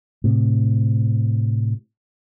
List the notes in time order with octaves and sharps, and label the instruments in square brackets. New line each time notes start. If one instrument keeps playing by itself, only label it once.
[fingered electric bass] A2 C3